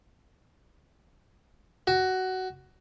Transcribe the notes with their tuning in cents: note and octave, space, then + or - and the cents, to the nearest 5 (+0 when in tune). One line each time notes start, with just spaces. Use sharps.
F#4 +15